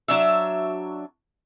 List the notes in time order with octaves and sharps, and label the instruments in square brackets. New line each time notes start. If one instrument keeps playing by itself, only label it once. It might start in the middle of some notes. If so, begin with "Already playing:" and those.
[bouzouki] F#3 D4 E5